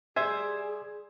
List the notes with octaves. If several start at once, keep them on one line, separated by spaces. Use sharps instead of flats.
G3 G#4 C5 E5 G#5 G#6